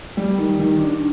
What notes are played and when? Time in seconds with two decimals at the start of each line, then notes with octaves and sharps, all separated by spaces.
0.17 G3
0.38 D#3
0.59 D#3
0.79 D4